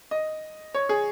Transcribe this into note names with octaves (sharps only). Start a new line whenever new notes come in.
D#5
C#5
G#4